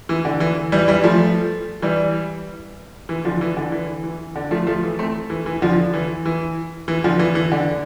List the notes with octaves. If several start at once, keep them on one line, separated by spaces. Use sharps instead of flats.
E3
D3
E3
E3 G3
E3 G3
F3 A3
E3 G3
E3
D3 F3
E3
D3
E3
E3
D3
F3 A3
F3 A3
E3
A3 C4
E3
E3
D3 F3
E3
E3
E3
D3 F3
E3
E3
D3